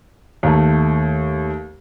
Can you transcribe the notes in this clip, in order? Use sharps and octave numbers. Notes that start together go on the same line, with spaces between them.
D#2 A3